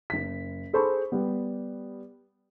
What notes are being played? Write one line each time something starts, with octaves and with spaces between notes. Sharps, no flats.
F#1 B6
G#4 A4 C5 A5 B5 C#6
G3 B3